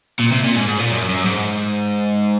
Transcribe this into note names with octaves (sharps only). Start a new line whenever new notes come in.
A#2
C3
A#2
G#2
G#2
A#2
F#2
F#2
G#2